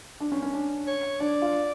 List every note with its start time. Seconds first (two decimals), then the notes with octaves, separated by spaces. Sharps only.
0.20 D4
0.32 C#4
0.42 C#4
0.54 D4
0.87 C#5
1.20 D4 D5
1.42 F4